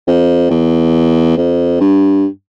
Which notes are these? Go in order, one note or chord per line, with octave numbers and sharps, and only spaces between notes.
F2
E2
F2
G2